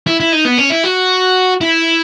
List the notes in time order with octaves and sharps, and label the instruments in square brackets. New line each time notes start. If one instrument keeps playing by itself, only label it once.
[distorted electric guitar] E4
E4
D#4
B3
C#4
E4
F#4
E4